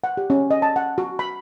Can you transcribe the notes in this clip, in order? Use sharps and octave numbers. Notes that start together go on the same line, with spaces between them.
F#5
G4
C#4
D#5
A5
F#5
F#4
B5